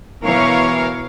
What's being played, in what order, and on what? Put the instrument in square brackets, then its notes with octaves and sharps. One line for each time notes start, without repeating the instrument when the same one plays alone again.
[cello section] B2 E3 A#4 C#5 F5